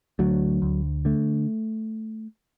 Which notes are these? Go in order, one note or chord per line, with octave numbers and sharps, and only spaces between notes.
D2 F#3
D2
D3 A3